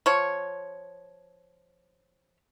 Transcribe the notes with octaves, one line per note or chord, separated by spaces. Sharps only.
F3 C#5